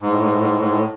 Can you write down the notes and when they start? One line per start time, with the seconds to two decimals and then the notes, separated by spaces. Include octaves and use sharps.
0.02 G#2
0.12 A2
0.21 G#2
0.32 A2
0.40 G#2
0.51 A2
0.60 G#2
0.70 A2